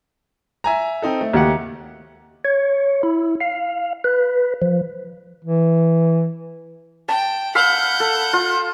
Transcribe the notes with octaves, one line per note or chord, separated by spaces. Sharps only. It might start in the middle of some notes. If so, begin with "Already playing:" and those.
E5 G#5 A#5
C4 D#4 A4
A3
D#2 G4 F#5
C#5
E4
F5
B4
F3
E3
G5 A5
F5 F#5 B5 E6 G6
A4
F4